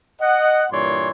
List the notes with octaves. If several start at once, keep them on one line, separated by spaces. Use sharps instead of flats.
D#5 F#5
G2 A#2 E3 C#5 D5 C6